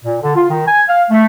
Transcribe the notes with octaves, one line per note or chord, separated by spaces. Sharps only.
A#2
D3
F4
D#3
G#5
F5
A3